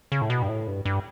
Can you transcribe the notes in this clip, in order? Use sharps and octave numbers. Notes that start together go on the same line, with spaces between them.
C#3
A2
B2
G2
A2
G2
G2